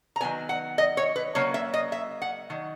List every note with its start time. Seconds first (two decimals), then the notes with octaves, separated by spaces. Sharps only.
0.16 A#5
0.20 D#3 F#3 B3 G#5
0.49 F#5
0.78 D#5
0.97 C#5
1.16 B4
1.35 C#3 F#3 A#3 C#5
1.54 E5
1.74 D#5
1.92 E5
2.22 F#5
2.50 D#3 F#3